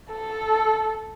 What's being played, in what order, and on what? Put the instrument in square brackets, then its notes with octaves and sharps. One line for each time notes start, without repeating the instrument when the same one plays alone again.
[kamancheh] A4